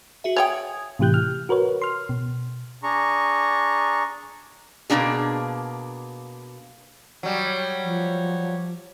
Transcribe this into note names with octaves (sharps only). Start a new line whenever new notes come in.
F#4 G#4 E5
C#5 D5 G5 G#5 D#6 G#6
A2 C3 E3 G4 F#6 G6
F6
F#4 A#4 B4 C#5
C6 F6
B2
D4 G#4 A#5 C#6
B2 E3 A#3 D4 G#4
F#3 G3 C#5
F3